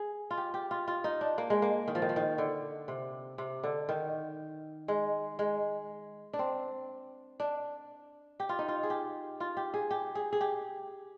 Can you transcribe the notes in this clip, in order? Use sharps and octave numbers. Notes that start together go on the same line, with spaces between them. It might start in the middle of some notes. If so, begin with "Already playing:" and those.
Already playing: G#4
F4
G4
G4
F4
F4
D#4
D4
A#3
G#3
A#3
D#3
F3
D#3
F3
D#3
D3
C3
C3
D3
D#3
G#3
G#3
D4
C4
D4
G4
F4
D#4
F4
G#4
G4
F4
G4
G#4
G4
G#4
G#4
G4